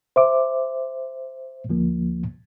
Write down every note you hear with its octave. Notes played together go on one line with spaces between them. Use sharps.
C5 E5 D6
D2 F3 A#3